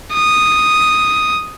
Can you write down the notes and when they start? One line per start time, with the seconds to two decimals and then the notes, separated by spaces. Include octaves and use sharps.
0.14 D#6